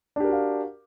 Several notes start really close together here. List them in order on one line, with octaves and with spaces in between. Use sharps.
D4 G4 A#4 F#4 F5